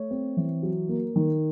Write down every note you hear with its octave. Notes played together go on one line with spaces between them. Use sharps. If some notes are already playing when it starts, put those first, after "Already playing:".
Already playing: A3 C#5
C4
E3
F#3
A#3
D#3